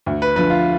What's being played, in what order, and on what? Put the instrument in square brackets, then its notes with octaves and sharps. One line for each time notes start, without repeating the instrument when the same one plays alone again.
[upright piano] D2
[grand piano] B4
[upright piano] D3 F3 [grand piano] B4
[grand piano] F4